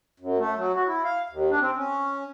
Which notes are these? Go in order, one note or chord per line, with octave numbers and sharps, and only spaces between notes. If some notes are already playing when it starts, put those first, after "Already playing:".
F#2
A3
F#3
F#4
E4
F5
D#2
D4
C4
C#4